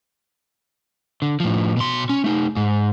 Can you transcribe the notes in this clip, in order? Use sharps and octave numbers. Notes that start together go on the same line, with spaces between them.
D3
A2 F3
B2 C6
C#4
A3 D#4
G#2